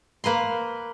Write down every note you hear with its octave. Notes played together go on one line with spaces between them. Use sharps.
A#3 B4 A#5 C6